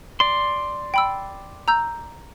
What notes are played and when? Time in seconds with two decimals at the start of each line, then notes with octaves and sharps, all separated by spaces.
0.20 D5 C6
0.94 G5 B5 E6
1.68 A#5 E6 G6